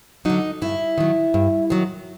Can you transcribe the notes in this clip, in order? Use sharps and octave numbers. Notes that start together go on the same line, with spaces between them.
D3 F#3 D#4
G2 E4
D#3 F#3
G2
D#3 F#3